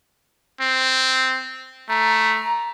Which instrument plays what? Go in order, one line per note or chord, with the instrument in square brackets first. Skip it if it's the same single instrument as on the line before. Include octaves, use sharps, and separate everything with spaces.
[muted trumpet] C4
[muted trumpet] A3 [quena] A#5